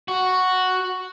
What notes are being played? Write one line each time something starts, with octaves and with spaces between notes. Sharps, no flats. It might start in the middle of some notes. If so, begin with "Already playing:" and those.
F#4